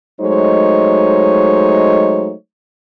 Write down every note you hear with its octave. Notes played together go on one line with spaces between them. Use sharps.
F#3 G#3 A3 D#4 C5 C#5